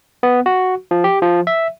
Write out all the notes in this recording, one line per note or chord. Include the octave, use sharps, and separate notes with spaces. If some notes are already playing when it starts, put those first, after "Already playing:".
B3
F#4
F3
G4
F3
E5